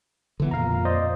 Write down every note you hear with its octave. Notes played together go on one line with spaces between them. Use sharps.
D3 E3 B3
F2 A#2 F5 A#5
C5 D5 D#5